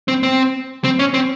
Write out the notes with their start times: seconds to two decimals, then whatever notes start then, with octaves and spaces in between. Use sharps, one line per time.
0.08 C4
0.23 C4
0.84 C4
0.99 C#4
1.14 C4